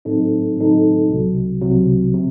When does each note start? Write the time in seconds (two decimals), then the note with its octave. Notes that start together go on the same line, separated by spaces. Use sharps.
0.05 A2 F#3 C4 D#4 A4
0.57 A2 F#3 C4 D#4 A4
1.10 C2 C3 F#3
1.61 C2 C3 F#3
2.14 C3